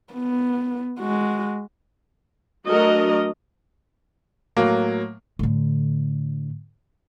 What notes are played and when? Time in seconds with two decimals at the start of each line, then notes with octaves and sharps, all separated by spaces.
0.13 B3
1.00 G#3 F#4
2.70 F#3 A3 D4 F#4 A#4 D#5
4.57 A2 F#3 A#3
5.39 A2 D3